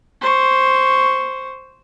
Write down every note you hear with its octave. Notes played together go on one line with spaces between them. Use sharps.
C5 C#6